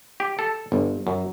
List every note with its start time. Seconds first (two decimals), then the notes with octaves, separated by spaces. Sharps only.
0.20 G4
0.39 A4
0.72 G1
1.07 F#2